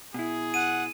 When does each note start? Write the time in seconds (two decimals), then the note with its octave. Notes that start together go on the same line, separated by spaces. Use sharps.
0.14 B2 E4 G#4
0.54 F#5 D#7